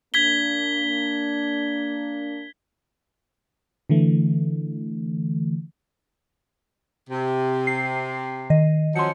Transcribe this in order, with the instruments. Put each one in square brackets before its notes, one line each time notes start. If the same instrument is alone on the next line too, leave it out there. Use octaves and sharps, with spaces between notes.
[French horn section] A#3 D4 [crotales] G#6 B6 G7
[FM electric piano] D3 E3 A3
[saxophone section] C3
[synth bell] C7
D#3 D#5
[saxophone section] F3 F#3 C#4 [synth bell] C6 C#7